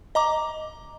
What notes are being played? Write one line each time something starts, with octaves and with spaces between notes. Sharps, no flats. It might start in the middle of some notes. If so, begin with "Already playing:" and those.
D#5 A#5 D6